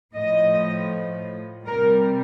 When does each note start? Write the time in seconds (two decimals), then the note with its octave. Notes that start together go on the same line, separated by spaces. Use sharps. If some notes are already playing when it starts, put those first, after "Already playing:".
0.14 A2 F3 D#5
1.66 C3 G3 A#4